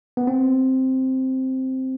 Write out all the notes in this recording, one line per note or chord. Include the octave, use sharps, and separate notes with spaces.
B3
C4